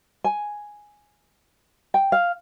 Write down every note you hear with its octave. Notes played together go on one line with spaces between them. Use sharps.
G#5
G5
F5